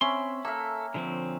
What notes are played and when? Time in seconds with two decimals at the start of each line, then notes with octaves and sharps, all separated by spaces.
0.01 C4 C#4 E5 B5 C6
0.45 A#3 A4 E5
0.94 D3 F3 C4